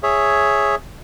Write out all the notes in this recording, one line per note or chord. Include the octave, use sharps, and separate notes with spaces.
G#4 C#5 E5